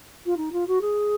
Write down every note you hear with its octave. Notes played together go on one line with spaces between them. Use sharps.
F4
D#4
F4
F#4
G#4